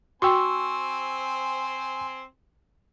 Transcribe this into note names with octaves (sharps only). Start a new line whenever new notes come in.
C4 F#4 C5 G5 G#5 C6 C#6 E6